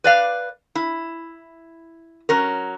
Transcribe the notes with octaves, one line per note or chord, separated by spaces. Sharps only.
B4 D5 F5
E4
F#3 C#4 A#4